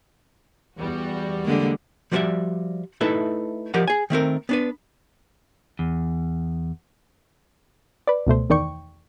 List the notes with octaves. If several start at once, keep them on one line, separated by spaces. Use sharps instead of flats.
E2 G3 F#4
D3 G#3 A#3
F3 G3 F#4 B4 D5 E5
A3 D#4 E4 A4 B4 E5
F3 G4 A#4 D5 D#5 F#5
G#4 G#5
D#3 A3 C4 A#4
B3 D4 B4
E2
B4 D5
C#2 B2 A3 C5
E2 D#3 D5 G5 C#6